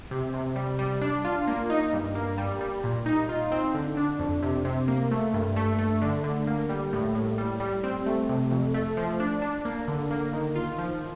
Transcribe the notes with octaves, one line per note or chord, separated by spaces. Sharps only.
C3
C3
G3
G3
D4
F4
A#3
D#4
G2
A#3
G3
G3
A#2
D#4
F4
C4
D3
D4
F2
C3
C3
A#3
A3
G2
A3
A3
D3
D3
A#3
G3
A2
A2
G3
G3
C4
A3
C3
F2
A3
F3
D4
D4
A#3
D3
A#3
D#3
F4
F3